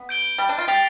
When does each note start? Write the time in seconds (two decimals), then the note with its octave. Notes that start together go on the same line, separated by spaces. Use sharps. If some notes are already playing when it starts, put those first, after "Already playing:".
Already playing: B3
0.09 G6 D7 G7
0.38 G3
0.49 D4
0.58 F4
0.68 G4 A6 C7 F7